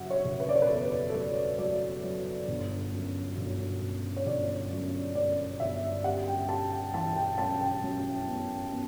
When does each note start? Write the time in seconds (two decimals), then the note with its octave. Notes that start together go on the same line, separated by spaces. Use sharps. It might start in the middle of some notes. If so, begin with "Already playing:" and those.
Already playing: F#1 F#3 E5 F#5
0.10 C#5
0.25 F#1
0.40 B4
0.49 D5
0.56 C#5
0.62 B4
0.69 E2 A4
1.09 A4
1.14 F#3 B4
1.58 F#3 D5
2.04 F#3
2.48 G1
2.93 F#2
3.37 G1
3.81 G1
4.17 C#5
4.26 G1 D5
4.71 F#2
5.15 F#2 D5
5.60 G1 E5
6.04 G3 F#5
6.27 G5
6.49 G3 A5
6.72 G5
6.94 E3 A5
7.16 G5
7.38 F#2 A5
7.61 G5
7.83 F#2
8.27 B3
8.71 B3